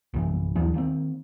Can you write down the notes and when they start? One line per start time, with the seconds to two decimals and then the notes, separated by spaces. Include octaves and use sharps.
0.14 A#1 F#2 C3 E3
0.55 D#2 E3 F#3 D4
0.74 D#3 A#3 C4